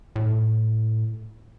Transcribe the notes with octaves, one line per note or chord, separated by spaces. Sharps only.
A2